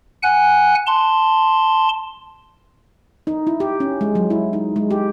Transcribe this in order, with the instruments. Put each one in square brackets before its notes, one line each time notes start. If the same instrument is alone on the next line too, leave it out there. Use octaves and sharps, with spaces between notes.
[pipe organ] F#5 G#5 F#6
A5 C6
[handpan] D#4
E4
G4
C#4
G#3
F#3
E4
D#4
G#3
G4